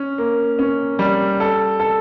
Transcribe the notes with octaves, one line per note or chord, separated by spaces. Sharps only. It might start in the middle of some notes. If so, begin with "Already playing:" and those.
Already playing: C#4
A#3
C#4
G3
A4
A4